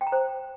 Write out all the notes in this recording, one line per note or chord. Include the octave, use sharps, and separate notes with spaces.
G5
A#5
C5